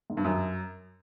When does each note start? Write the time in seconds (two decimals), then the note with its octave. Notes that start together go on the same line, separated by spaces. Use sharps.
0.10 G#2
0.17 G2
0.25 F#2